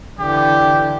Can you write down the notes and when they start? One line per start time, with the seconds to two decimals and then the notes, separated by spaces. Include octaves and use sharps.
0.19 D3 E3 G4